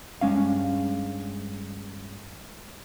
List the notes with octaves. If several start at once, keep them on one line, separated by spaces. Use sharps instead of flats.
G2 G#3 C#4 F5